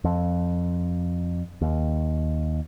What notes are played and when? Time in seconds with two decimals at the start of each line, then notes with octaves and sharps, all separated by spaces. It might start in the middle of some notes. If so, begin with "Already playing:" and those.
0.04 F2
1.61 D#2